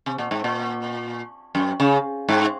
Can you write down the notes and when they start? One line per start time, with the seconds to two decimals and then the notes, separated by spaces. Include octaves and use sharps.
0.06 C3
0.18 A#2
0.31 G#2
0.44 A#2
1.55 F#2
1.80 C#3
2.29 G#2